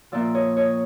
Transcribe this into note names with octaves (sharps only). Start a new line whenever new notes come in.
A#2 F3 D5 E5
C#5 D#5
C#5 D#5